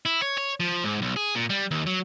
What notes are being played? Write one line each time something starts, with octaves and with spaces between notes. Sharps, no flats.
E4
C#5
C#5
F3
G#2
B1
G#4
A#2
G3
D#2
F#3